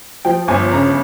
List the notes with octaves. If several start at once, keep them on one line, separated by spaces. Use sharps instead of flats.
F3 G5
G1 G#5
C#3 A#5